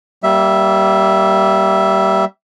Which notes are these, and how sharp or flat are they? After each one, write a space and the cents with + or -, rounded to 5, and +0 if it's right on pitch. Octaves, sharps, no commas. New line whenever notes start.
G3 -20 A#3 +0 E5 +0